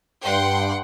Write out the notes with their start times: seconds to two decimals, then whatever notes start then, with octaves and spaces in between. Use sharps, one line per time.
0.24 G2 F#5 G5 C6